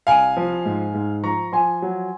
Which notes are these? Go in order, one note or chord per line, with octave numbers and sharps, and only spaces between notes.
C2 F5 G#5
F3
G#2
G#2
F3 A#5 C#6
F3 G#5 C6
F#3